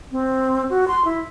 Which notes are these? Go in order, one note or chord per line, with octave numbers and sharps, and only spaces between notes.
C4
F#4
C6
E4